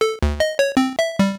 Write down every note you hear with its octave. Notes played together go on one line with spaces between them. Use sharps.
A4
D2
D#5
C#5
C4
E5
G3